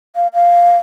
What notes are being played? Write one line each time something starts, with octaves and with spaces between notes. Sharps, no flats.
F5
F5